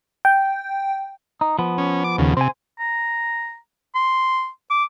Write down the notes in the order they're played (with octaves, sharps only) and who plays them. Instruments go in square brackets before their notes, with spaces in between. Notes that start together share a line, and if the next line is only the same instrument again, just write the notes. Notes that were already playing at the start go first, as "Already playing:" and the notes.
[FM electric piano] G5
[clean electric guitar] D#4
F3 B3
[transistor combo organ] C#4
D6
D#2 C#3
[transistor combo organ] C3 [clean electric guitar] C5 G#5
[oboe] A#5
C6
D6